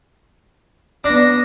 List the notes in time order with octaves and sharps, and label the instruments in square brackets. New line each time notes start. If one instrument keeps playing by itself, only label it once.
[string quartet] B3 A#6 [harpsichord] D4